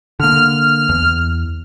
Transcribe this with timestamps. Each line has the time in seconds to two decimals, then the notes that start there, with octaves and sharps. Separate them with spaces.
0.20 D3 A#3 F6
0.89 E2